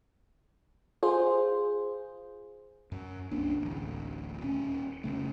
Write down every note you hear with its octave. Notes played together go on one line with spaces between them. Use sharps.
F4 G#4 C5
F#2
C2 A#3 C#4 D4
D1 A1
D#1 C#4
F1 B1 C#3 A3